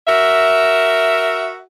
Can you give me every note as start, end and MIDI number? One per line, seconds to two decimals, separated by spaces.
0.08 1.59 66
0.08 1.59 70
0.08 1.59 76